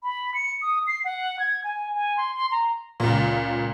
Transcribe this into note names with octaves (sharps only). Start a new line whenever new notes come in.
B5
C#7
D#6
C7
F#5
G#6
G#5
G#5
C6
C6
A#5
C#2 A#2